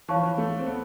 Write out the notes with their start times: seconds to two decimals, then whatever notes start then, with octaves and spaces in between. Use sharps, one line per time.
0.08 E3 C#5 F5 A5 C#6
0.16 F3
0.23 E3
0.38 A3
0.59 C4
0.67 B3